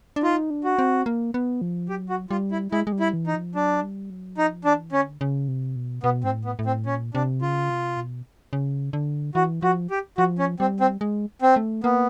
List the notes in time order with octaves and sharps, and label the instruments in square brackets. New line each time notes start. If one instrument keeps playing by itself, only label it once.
[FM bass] D4
[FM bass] D#4 [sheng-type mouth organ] F4
[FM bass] D4
[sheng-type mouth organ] F#4
[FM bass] C4
A#3
B3
F3
[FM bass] F#3 [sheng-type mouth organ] G4
[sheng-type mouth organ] F#4
[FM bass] G3 [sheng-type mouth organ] F4
[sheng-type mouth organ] E4
[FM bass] G#3 [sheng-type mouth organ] E4
[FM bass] G#3
G3
[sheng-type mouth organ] E4
[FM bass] E3
[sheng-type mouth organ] D#4
[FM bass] F3
[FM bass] F#3 [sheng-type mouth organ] D4
[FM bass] G3
F#3
[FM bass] F3 [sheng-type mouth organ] D#4
[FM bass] E3 [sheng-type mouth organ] D4
[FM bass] D3 [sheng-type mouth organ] C#4
[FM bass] C#3
C3
B2
[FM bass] B2 [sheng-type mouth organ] B3
[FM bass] G#2 [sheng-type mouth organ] C4
[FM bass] A2
[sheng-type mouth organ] B3
[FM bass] A2
[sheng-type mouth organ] C4
[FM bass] A#2 [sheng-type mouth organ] C#4
[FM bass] C3 [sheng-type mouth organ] D4
[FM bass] C#3 [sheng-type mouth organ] F4
[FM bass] C3
B2
C#3
D3
[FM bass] E3 [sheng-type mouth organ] F#4
[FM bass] F3 [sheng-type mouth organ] F#4
[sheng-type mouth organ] G4
[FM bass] F3 [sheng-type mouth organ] F#4
[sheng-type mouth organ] C#4
[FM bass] G3 [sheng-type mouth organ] C4
[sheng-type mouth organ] C4
[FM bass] G#3
[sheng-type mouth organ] C4
[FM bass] A3
[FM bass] A#3 [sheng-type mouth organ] B3